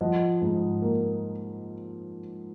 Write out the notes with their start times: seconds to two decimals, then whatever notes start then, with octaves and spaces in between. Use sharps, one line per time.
0.01 F3 D#5 F#5
0.42 G#2
0.82 A#3